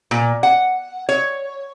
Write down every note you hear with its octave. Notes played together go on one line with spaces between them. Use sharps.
A#2
F#5
C#5